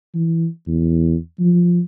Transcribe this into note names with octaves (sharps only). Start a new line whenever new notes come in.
E3
E2
F3